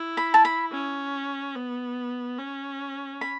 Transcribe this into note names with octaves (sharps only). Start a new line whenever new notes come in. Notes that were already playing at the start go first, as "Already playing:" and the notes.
Already playing: E4
B5
A5
B5
C#4
B3
C#4
B5